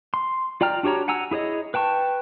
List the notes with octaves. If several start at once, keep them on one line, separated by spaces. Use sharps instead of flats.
C6
F4 D5 G5 A#5 F6
D4 F#4 G4 C#5 A#5
F#5 G#5 A#5 E6
E4 G#4 C#5 D#5
B4 G5 A5 C#6